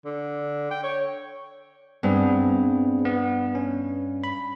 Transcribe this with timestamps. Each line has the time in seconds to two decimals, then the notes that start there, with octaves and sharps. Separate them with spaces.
0.05 D3
0.71 G5
0.83 C#5
2.03 G2 B3 C4 G#4
3.05 B3
3.55 C#4
4.24 B5